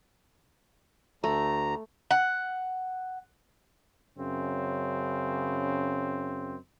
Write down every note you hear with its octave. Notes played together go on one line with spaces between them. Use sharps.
D2 A3 A#5
F#5
F#2 C#3 C4